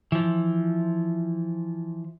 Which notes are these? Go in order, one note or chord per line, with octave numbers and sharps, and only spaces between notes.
E3 F3